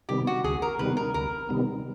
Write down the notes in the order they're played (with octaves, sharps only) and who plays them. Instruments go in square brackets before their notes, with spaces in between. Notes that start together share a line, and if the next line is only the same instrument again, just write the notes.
[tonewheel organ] C3 D#3 G3 B3 [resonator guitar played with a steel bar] G4
[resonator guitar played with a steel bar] F#4
[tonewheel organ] D2 [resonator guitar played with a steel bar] G#4
[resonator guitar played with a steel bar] A#4
[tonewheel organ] C3 D#3 G3 B3 [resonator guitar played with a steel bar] B4
[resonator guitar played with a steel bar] A#4
[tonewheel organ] D2 [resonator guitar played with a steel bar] A#4
[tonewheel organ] C3 D#3 G3 B3